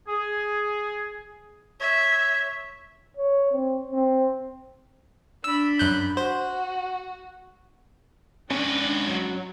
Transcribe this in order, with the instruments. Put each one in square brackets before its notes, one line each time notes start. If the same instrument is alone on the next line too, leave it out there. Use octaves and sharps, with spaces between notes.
[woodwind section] G#4
[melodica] C#5 [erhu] E5
[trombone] C#5
C4
C4
[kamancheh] D4 B5 [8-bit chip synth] E6
[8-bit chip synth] F#2 F#6 G6
[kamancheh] F#4 [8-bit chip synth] C5
[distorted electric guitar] G#2 B4 [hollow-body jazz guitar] C#4 [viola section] D4 G5
[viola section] F#3